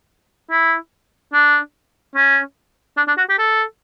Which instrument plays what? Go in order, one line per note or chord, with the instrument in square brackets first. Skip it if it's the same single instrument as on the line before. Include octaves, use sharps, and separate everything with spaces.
[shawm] E4
D4
C#4
D4
D4
F#4
G4
A4